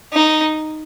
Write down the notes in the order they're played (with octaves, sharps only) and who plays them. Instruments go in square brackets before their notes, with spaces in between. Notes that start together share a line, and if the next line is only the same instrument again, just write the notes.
[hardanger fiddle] D#4